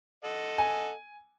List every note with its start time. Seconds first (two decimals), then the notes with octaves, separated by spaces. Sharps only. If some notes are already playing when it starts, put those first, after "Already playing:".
0.24 A4 D#5 F#5
0.58 G#5